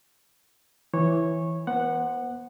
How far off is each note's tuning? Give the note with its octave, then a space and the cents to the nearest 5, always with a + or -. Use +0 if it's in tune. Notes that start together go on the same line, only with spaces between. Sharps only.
E3 +0 C#5 -15
B3 -35 C5 +5 F#5 +0